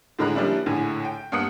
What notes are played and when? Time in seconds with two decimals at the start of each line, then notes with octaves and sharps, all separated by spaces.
0.19 A2 D3 G#3 A#4 B5 F#6
0.35 F3 G3 A#3 C#4 D4 E4
0.66 A#1 A2 D3 G#5
1.05 G5
1.32 G2 A#3 B3 D#6 F#6 C#7